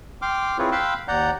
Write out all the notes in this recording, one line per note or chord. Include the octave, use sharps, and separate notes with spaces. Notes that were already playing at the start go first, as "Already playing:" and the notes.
G5 C6 D6 F6
C4 E4 F4 G#4 B4 C#5
F5 G5 B5 C6 E6 F#6
D#2 D5 F#5 A#5 G6